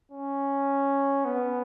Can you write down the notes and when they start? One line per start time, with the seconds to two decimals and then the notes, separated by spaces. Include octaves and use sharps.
0.12 C#4
1.25 B3